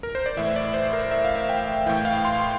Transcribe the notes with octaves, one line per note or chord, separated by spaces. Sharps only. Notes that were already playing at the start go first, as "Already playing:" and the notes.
A#4
C5
D5
A2 E3 E5
D5
C5
A#4
E5
F5
E5
G5
A2 E3 G5
F5
C6